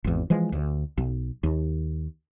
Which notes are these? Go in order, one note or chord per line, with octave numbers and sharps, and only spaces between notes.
G#1 E2
E3 F3 G#3
D2
B1
D#2